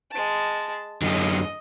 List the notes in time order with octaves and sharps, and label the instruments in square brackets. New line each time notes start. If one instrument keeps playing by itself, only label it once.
[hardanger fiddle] G#3 A5
[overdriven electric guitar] F#2 D3 [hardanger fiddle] D#5